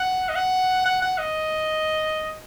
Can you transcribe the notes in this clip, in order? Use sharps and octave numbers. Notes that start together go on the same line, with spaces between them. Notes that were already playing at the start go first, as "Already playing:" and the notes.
Already playing: F#5
D#5
F#5
F#5
F#5
D#5